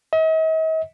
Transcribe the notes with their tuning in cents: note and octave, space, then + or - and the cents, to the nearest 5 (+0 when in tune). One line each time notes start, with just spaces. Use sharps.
D#5 +45